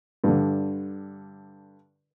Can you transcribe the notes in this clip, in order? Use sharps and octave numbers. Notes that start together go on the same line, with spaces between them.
G2 D3